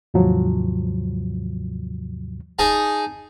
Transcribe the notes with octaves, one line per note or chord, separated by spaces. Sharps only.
D#2 G#2 C3 F3 F#3
D#4 G#4 D#5 A5